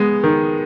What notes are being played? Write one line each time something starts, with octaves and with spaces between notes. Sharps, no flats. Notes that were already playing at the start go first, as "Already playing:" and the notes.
Already playing: G#3 B3
D#3